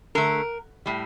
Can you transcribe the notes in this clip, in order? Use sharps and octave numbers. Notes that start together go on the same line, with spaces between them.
D3 A3 A#4
A2 G3